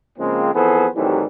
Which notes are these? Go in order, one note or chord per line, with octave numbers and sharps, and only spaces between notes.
C#3 F3 G#3 A#3 C4
F2 E3 B3 G#4 A4 C5
A2 C3 D#3 E3 F#3 G3